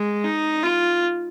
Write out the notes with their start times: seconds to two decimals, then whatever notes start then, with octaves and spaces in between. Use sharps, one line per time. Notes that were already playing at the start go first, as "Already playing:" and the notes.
Already playing: G#3
0.24 D#4
0.63 F4